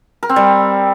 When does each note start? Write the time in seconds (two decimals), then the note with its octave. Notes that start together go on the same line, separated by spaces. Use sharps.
0.23 A#4
0.29 C4
0.36 G3